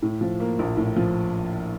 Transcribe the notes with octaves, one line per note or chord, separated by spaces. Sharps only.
A2
F3
A#3
A#1
A2
F3